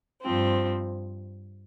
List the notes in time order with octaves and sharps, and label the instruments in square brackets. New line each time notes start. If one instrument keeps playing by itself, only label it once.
[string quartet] G2 F3 C4